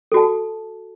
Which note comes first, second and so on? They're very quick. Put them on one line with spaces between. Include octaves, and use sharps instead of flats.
A4 F#4 A5